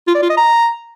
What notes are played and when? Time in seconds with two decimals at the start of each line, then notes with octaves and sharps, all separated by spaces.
0.07 F4
0.15 D5
0.22 F4
0.30 D#5
0.37 A#5